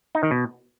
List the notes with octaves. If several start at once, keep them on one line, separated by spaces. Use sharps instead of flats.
D#4
D#3
B2